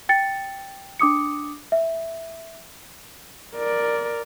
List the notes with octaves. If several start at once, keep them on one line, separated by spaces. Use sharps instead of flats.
G5 A6 C#7
D4 D6 D#6 C#7
E5
A#4 D5